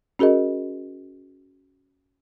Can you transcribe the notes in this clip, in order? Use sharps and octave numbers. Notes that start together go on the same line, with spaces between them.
C#4 F#4 G#4 A#4 D#5